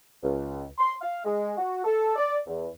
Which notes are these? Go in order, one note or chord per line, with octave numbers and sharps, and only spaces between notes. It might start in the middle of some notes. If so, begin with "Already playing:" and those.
C#2
C6
F5
G#3
F#4
A4
D5
E2